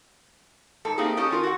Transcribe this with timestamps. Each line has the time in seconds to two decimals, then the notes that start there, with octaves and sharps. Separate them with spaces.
0.85 G#2 A4
0.98 A3 A#3 C4 D#4 G4 G#4
1.17 C#4 G4 A4 D#5
1.30 C#4 F4 A#4
1.43 F#4 A4 F#5